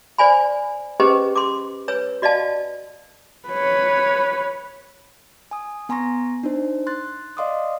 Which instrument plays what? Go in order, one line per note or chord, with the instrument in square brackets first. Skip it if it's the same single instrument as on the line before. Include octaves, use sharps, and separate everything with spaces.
[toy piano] C5 D5 G#5 B5
C#4 G4 G#4 B4 C5 D#5
C6 D6
B4 C#5 E6
F#4 D5 D#5 F5 A5
[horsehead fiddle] B4 C#5
[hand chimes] G#5 D#6
B3 G#5 A#5 C6 C#6 A#6
D4 D#4 C5
C6 F#6 A6
D5 D#5 F5 C6 D6 D#6